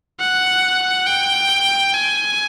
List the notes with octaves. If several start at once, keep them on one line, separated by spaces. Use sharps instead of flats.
F#5
G5
G#5